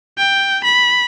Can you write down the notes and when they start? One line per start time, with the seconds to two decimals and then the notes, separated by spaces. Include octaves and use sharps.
0.18 G5
0.64 B5